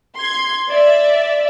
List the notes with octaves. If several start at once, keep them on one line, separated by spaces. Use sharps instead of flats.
C6 G#6
D5 E5